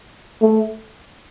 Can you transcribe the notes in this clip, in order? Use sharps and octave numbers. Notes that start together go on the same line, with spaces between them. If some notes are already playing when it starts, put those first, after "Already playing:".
A3